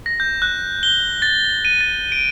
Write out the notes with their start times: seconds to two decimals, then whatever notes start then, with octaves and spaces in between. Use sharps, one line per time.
0.06 A#6
0.20 G6
0.42 F#6
0.83 G7
1.22 A6
1.65 D#7
1.81 A6
2.12 D7